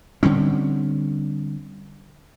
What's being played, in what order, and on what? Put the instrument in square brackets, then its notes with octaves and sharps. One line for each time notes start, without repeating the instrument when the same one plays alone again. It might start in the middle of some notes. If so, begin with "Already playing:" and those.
[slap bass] D3 G3 C4 C#4